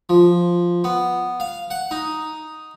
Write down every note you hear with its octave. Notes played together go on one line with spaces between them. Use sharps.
F3
B3
F5
F#5
D#4